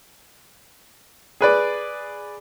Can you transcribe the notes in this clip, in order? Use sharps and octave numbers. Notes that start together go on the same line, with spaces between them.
G#4 B4 D5